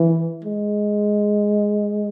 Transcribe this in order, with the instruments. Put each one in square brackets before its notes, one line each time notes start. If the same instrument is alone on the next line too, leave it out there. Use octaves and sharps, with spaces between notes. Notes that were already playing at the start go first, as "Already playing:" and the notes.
Already playing: [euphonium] E3
G#3